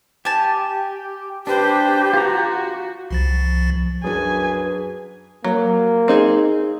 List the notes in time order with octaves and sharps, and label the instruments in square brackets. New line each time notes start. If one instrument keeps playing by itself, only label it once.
[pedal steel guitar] G4 [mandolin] G#5 A5
[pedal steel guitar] D4 [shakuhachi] G4 [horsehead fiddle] B4 C5
[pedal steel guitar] F4 A#5 [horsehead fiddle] F#4
[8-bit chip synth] C2 F3 A6
[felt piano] F#2 F#3 D4 [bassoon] G#4 [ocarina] B4 [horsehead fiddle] G#5
[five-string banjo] F#3 [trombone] A#3
[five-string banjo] C4 D#4 G#4